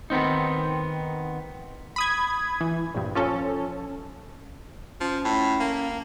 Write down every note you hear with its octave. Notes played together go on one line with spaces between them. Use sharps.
D#3 B3 C4 D#4
B5 D#6 G#6
E3
A#1 G2
F3 C#4 A4
F3 C#4
A2
A#3